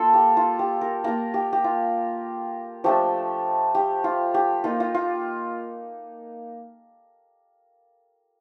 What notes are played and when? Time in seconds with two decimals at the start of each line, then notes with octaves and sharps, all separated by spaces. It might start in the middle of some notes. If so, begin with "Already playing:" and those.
Already playing: A#3 D4 F4 A4
0.14 G4
0.37 F4
0.59 G4
0.81 A#4
1.04 A#3 F4 A#4
1.34 G4
1.53 G4
1.64 F4
2.84 F3 A3 D4 G4
3.75 G4
4.04 F4
4.34 G4
4.64 A#3 D#4 F4
4.80 F4
4.95 F4